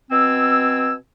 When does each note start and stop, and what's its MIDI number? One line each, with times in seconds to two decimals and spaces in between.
0.11 0.93 47
0.11 0.93 60
0.11 0.93 80
0.11 0.93 88